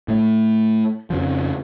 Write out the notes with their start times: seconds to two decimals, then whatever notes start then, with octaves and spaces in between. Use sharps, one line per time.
0.08 A2 A3
1.10 F2 C#3 F3